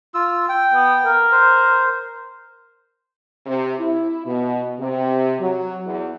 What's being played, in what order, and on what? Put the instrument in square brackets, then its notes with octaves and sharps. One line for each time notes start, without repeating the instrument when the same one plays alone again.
[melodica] F4 E6
G5
[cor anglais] B3
A#4
[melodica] C5
[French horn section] C3
E4
B2
C3
F#3
E2